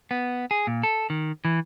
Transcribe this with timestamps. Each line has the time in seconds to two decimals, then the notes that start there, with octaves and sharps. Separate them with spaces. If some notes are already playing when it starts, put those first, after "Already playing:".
0.11 B3
0.51 G#4
0.67 A#2
0.83 A4
1.10 D#3
1.45 E3